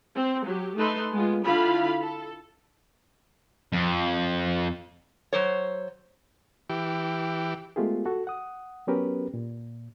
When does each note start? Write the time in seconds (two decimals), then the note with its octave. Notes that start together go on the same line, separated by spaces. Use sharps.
0.15 C4
0.45 F#3 G4
0.76 A3 D#4 A4 B4 C6
1.12 G#3 B3 F4
1.45 D3 E4 F4 F5 B5
2.01 A4
3.72 F2
5.33 F#3 C5 C#5
6.69 E3 G4
7.76 G#3 A3 B3 F4 G4 G#4
8.06 F#4 A4
8.27 F#5 D#6
8.87 F#3 B3 C#4 G4 A#4 B4
9.34 A#2